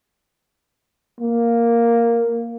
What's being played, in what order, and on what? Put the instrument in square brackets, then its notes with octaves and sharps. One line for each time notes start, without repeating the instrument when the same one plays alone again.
[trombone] A#3